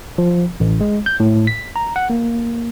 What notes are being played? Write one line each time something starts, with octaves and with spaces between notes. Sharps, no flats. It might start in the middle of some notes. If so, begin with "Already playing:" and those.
F3
A1
G#3
G6
A2
B6
A#5
F#5
A#3